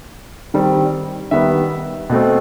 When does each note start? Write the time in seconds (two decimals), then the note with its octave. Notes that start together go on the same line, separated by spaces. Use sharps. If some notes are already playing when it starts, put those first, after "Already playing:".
0.54 D#3 G3 C4
1.31 D#3 G3 B3 E5
2.10 B2 A3 C4